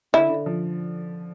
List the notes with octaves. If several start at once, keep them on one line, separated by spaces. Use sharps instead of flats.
D3 E4
D3
F3